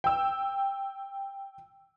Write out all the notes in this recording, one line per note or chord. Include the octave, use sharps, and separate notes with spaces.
G5 E6